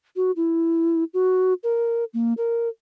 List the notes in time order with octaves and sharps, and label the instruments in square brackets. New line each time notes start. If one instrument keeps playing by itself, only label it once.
[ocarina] F#4
E4
F#4
A#4
A#3
A#4